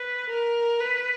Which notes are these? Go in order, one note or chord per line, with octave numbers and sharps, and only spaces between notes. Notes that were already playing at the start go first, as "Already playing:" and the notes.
Already playing: B4
A#4
B4